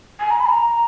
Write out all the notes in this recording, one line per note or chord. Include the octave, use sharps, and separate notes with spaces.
G#5
A#5
B5
G#5
A#5